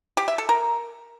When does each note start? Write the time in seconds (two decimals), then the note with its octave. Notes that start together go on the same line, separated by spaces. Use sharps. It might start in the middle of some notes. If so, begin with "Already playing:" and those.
0.17 G4
0.28 E5
0.38 A4
0.49 A#4